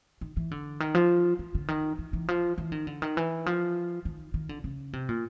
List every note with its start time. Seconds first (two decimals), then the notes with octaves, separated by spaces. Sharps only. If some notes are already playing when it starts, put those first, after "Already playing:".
0.21 D#3
0.37 E3
0.51 D3
0.80 D#3
0.95 F3
1.39 E3
1.55 D3
1.68 D#3
1.99 E3
2.13 E3
2.28 F3
2.58 E3
2.72 D#3
2.87 D3
3.02 D#3
3.17 E3
3.46 F3
4.05 D#3
4.34 D#3
4.49 D3
4.64 C#3
4.93 C3
5.09 A#2